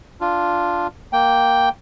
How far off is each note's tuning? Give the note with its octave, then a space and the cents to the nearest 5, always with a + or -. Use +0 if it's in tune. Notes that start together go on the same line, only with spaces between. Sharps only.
D4 +0 F4 +0
A#3 +0 G5 +0